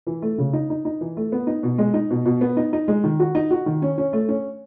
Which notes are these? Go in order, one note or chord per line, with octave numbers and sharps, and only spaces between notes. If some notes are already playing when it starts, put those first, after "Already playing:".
E3
A3
C#3
D#4
D#4
D#4
E3
A3
B3
D#4
B2
G#3
D#4
B2
B2
B3
D#4
D#4
G#3
D#3
F#4
D#4
F#4
D#3
C#4
C#4
A3
C#4